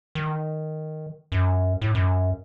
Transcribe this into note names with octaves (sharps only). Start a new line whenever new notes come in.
D#3
F#2
A2
F#2